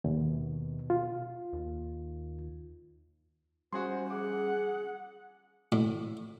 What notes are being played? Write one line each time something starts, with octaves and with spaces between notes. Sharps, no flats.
D#2 B2
F4
D#2
G3 C#4 F#4 G#4 C5 C6
G#4 F#5 D6
A2